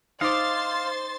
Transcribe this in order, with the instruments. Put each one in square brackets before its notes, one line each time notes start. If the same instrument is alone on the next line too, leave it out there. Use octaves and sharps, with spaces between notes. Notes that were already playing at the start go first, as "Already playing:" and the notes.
[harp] D#4 D6 [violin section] C5 C6 A6 [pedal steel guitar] F5